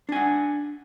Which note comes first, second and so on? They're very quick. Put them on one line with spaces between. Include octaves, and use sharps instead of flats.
D4 G#5 F#5